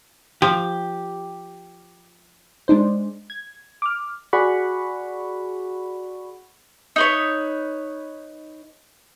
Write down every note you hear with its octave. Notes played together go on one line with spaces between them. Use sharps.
F3 G4
G#3 D4 D#4 C5
G#6
D6 F6
F#4 G#4 D5 F#5 B5 C#6
D#4 B4 C#5